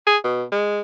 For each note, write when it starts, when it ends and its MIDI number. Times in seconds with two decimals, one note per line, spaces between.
0.07 0.17 68
0.24 0.44 47
0.52 0.81 56